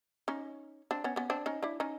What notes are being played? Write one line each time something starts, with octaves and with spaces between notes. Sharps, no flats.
C#4 D#4
C4 D4
B3 C#4
B3 C#4
C4 D4
C#4 D#4
D4 E4
C#4 D#4